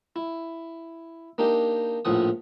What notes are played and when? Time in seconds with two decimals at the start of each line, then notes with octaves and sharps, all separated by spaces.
0.16 E4
1.38 A#3 D4 D#4 G4
2.05 A#1 A2 F3 F#5 D#6